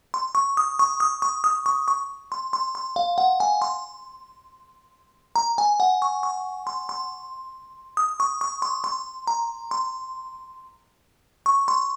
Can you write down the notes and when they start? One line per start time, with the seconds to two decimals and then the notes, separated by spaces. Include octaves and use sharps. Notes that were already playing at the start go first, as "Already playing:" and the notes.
0.14 C6
0.35 C#6
0.57 D#6
0.79 C#6
1.00 D#6
1.22 C#6
1.44 D#6
1.66 C#6
1.88 C#6
2.32 C6
2.53 C6
2.75 C6
2.96 F5
3.18 F#5
3.40 G#5
3.62 C6
5.36 A#5
5.58 G#5
5.80 F#5
6.02 C#6
6.23 C#6
6.67 C6
6.89 C6
7.97 D#6
8.20 C#6
8.41 C#6
8.62 C6
8.84 C6
9.27 A#5
9.71 C6
11.46 C#6
11.68 C6